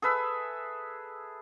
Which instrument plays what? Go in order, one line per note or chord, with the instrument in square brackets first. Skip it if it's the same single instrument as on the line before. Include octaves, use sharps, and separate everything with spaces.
[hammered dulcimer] G#4 A4 B4 E5